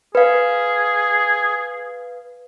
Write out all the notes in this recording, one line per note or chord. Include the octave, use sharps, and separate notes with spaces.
G#4 B4 F5